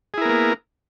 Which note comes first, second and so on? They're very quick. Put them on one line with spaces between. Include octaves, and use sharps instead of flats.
G#4 E4 A#4 B3 A#3